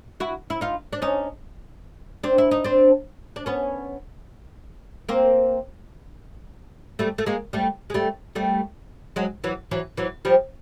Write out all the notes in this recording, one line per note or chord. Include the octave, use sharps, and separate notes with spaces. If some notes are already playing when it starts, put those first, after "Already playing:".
E4 F#4
E4
D#4 F4
D4
C#4 D#4
C4 D4
E4
D#4
C4 D4
D4
B3 C#4
A#3 C4
G3 A3
A3
G#3 A#3
G3 A3
G#3
G3 A3
G3 A3
F#3 G#3
E3 F#3
E3 F#3
E3 F#3
F3 G3